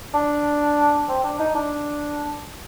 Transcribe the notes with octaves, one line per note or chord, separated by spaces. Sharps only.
D4
C4
D4
D#4
D4